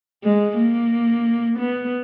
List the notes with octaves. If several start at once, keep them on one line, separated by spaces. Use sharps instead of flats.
G#3
A#3
B3